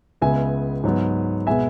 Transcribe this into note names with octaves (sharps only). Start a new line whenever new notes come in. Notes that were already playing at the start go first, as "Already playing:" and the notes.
C#2 C#3 G#3 B3 E5 G#5
G#2 F#3 B3
B2 G#3 B3 E5 G#5